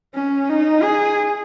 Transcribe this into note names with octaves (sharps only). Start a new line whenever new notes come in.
C#4
D#4
G#4